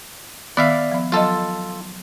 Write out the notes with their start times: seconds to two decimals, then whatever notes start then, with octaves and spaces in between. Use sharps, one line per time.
0.57 D#3 B3 D5 E5 F5
0.92 F3 B3
1.12 F#3 F4 A4 D#5